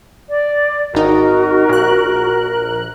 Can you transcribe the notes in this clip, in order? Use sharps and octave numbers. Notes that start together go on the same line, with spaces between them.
D5
G#1 D#4 F#4 A#4
A#1 F#6